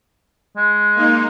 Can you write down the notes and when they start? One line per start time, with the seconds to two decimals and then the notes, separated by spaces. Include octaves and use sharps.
0.57 G#3
0.96 A#3 D#4